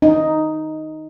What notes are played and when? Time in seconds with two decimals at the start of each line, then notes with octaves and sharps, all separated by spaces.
0.02 D#4